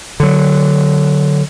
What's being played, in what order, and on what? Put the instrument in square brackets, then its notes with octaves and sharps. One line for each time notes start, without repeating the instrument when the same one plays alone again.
[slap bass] D3 F#3